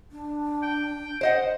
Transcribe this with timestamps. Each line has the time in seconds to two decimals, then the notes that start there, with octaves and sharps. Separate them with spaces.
0.12 D4
0.63 G5
1.21 C5 D#5 F#5